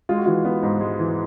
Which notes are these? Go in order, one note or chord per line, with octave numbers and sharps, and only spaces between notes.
G#3 F4
F#4
E3 F4
B3
G#2
G#3
E3